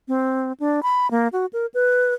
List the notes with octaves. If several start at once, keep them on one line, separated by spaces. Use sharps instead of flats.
C4
D4
B5
A#3
F#4
A#4
B4